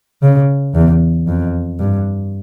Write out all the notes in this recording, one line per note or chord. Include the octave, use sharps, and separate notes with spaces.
C#3
E2
F2
G2